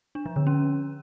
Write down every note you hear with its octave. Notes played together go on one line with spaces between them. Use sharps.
D4
F3
D3
C#4